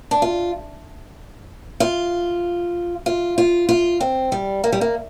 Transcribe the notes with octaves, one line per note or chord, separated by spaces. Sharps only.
D4
F4
F4
F4
F4
F4
C4
G3
A#3
G3
A#3